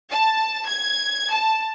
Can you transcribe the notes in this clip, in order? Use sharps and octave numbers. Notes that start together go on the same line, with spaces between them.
A5
G#6
A5